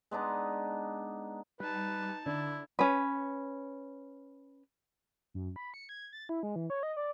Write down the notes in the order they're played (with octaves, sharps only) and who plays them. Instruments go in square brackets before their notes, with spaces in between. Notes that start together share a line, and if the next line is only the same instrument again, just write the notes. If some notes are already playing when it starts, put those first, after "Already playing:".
[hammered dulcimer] G#3 B3 D4 D#4
[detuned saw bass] G3 [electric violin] D#4 A5 [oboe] B4
[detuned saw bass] D3 [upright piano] D4 [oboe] E4
[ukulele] C#4 B4
[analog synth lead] F#2
B5
C#7
G#6
A6
E4
G#3
E3
C#5
D#5
D5